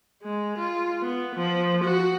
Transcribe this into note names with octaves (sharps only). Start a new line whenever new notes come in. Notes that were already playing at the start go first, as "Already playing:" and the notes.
G#3
F4
B3
F3
F#4